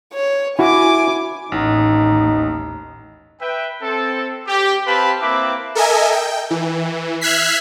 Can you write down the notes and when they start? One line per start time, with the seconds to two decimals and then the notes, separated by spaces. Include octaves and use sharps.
0.14 C#5
0.59 E4 F#4 G#5 D6
1.52 A1 D#2 A2 D#4
3.41 B4 E5 G5
3.82 C4 A4
4.48 G4
4.86 C4 G4 B4 F5 A5 B5
5.21 A#3 C4 E4 B4 E5 D6
5.75 A4 A#4 D#5 E5 G#5
6.12 G5
6.50 E3
7.21 E5 F6 F#6 G#6 B6 C7